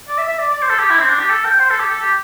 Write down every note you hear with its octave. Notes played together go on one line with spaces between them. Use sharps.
D5
E5
E5
D5
D5
C5
A4
G4
E4
C4
D4
G4
A4
G5
C5
A4
G4
A4
G4